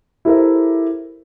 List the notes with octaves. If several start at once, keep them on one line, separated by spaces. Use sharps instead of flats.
E4 G4 A4 A#4 C5 E5